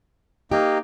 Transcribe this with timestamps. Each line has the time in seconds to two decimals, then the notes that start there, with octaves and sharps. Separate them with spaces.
0.51 A#3 D#4 G4